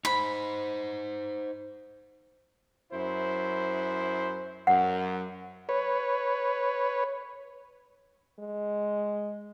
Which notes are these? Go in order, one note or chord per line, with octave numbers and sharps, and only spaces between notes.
D#4 C5 B5
F#2 E4 C5
F#2 F#5
B4 C#5
G#3